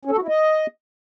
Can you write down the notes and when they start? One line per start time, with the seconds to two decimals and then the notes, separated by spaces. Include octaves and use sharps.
0.05 C#4
0.11 A4
0.17 F#4
0.22 E4
0.28 D#5